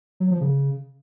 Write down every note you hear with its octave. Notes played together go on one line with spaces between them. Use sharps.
F#3
F3
C#3